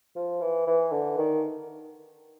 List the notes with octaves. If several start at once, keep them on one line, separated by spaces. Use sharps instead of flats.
F3
E3
E3
D3
D#3